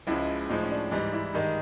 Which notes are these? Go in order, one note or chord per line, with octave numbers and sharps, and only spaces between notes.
C#2 C#3 F3 G#3 E4
A2 F3 G#3 D#4
C#4
D4
G#2 E3 G3 D#4
E4
G2 D#3 G#3 D#4